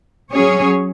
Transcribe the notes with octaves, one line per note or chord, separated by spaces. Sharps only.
F#3 C#4 G#4 C#5